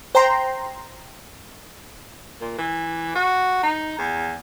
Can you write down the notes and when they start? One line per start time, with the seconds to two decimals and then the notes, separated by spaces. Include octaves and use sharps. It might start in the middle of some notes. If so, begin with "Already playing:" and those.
0.15 C5 G5 A#5 C6
2.41 A#2
2.58 E3
3.16 F#4
3.63 D#4
3.98 E2